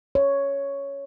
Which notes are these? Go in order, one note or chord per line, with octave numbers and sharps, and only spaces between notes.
C#5